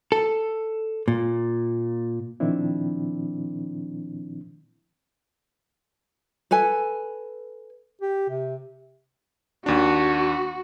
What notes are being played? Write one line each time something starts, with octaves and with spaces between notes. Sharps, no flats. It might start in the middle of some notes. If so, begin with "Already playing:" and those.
A4
A#2
A#2 D#3 F3 C4 D4 E4
A4 B4 G#5
G4
C3
D#2 D4 F#4